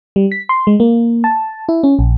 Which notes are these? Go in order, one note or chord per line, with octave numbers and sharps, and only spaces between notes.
G3
B6
C6
G#3
A#3
A5
E4
C#4
A#1